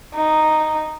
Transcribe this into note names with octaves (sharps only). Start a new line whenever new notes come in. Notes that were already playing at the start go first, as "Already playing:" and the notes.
D#4